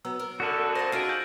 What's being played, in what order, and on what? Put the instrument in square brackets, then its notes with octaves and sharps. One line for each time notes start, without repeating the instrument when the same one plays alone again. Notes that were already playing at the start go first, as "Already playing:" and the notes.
[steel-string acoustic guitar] F#3 B3 A#5 [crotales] E6
[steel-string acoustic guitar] A#4
[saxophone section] F#2 D3 [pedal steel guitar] F#4 A4 [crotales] D#6 F6 F#7
[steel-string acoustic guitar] C5 D#5 F5 [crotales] A6 A#6
[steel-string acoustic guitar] C#4 F#4 D#5 [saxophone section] D#4 F4 G#4 [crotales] C7 D7
[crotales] G6 F#7